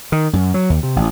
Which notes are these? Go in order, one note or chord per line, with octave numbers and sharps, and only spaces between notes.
D#3
F#2
F#3
D#2
C3
A1